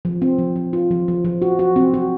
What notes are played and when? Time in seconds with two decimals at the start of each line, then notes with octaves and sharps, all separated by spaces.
0.05 F3
0.22 C4
0.39 F3
0.56 F3
0.73 F4
0.91 F3
1.08 F3
1.25 F3
1.42 F#4
1.59 F#4
1.76 C4
1.94 F#4